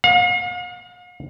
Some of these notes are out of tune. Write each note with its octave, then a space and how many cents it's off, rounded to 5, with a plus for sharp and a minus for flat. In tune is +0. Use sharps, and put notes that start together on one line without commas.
F5 +45